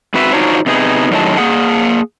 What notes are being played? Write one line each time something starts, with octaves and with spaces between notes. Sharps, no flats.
G#2 C4 F#4 B4 E5
D4 D#4 F4 F#4 C5 C#5
C3 B3 D#4 G#4
F#2 A2 D#3 F#3 G#3 A5
A#3 G#4 F#5